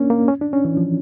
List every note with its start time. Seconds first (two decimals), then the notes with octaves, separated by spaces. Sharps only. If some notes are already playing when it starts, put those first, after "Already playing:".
Already playing: A#3 C#4 D4
0.10 A#3
0.28 C#4
0.41 D4
0.53 C#4
0.65 E3
0.77 F3